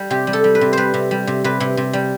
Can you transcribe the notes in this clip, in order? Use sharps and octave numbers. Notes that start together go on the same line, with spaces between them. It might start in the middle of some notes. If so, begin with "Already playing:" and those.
Already playing: G3
C3 G4
G3
A4
G3
B4
C3
G3 B4 C5
C3
G3
C3
C3 B4
C3
C3
G3